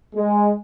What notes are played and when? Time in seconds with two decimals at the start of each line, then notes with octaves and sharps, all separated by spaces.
0.15 G#3